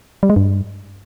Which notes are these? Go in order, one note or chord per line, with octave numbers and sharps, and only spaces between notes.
G3
G#3
G2